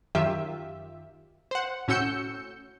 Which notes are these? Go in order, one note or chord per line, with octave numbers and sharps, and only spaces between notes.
F#2 D#3 F4 G4 E5
C5 F#5
A2 C#4 F#4 E6 G6 C#7